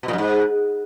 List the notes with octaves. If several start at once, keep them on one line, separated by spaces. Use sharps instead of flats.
B2
A#2
F#2
G#2